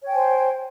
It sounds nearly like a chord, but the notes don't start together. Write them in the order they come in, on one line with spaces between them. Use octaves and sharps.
C#5 G5 G#5 C5